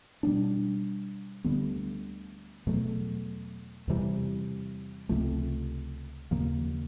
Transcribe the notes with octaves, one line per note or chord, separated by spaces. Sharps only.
B2 G3 B3 D4
D2 D3 G3 B3
E2 B2 F#3 A3
E2 C3 E3 G3
C#2 C3 F3 A3
D#2 C#3 F3 A#3